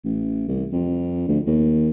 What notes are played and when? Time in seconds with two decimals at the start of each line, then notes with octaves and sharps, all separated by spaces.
0.05 A1
0.48 C2
0.72 F2
1.28 D2
1.46 D#2